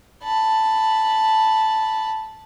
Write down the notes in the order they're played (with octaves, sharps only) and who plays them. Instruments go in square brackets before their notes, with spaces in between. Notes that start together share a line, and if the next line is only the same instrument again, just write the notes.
[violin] A5 B5